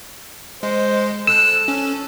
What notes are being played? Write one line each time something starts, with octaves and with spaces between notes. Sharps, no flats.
G#3 C5
A4 E6 F#6 E7
C#4